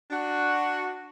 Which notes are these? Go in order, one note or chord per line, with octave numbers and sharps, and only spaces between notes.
D4 F#4